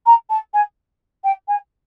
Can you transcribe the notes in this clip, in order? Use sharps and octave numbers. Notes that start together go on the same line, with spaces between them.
A#5
A5
G#5
G5
G#5